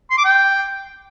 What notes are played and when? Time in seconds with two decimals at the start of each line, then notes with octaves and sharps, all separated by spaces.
0.11 C6
0.18 D6
0.25 G5